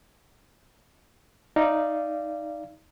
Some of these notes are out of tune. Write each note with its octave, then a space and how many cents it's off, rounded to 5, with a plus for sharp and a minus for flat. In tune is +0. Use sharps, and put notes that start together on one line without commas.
D#4 +0 D5 +0 F5 -30